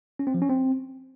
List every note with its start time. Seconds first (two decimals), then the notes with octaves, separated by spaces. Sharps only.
0.19 C#4
0.27 C4
0.34 F3
0.42 C#4
0.49 C4